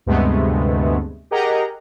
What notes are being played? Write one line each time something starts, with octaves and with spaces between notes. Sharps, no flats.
D2 G2 C3 G#3 A3 B3
G4 G#4 A#4 D#5 F#5 A#5